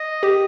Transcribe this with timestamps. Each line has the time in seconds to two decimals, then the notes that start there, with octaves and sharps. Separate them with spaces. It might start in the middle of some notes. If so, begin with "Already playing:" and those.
Already playing: D#5
0.23 G4